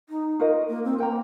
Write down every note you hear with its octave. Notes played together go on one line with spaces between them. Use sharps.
D#4
F4 A#4 D#5
A#3
C4
A#3 A#4 G5 A#5